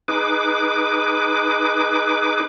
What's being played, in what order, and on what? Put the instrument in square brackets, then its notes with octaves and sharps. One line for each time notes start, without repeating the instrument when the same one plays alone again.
[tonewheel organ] D#4 G#4 B4 D6